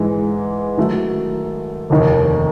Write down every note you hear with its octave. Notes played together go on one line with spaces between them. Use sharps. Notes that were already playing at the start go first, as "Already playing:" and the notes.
Already playing: G#2 E3 G#3
D#3 F#3 A3
F1 D#2 D#3